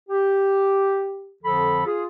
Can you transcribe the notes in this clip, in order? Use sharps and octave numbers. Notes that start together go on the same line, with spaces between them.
G4
F2 D3 F3 A4 B5
F4 G#4